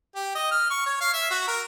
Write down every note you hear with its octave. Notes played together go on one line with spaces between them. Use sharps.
G4
D#5
F6
C#6
C#5
F5
E5
F#4
A#4